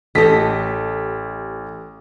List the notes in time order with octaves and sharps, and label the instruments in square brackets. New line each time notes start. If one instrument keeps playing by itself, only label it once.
[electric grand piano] A1 B6 [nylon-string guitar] G4 A4 D#5